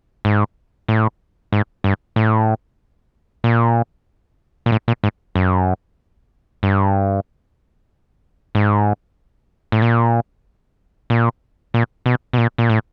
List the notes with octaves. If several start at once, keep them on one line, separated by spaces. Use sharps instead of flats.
G#2
A2
G#2
G2
A2
A#2
A#2
A2
A#2
G#2
F#2
G2
G#2
A2
A#2
A#2
A#2
B2
B2
A#2
A#2
A2